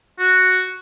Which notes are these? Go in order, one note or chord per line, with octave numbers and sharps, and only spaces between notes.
F#4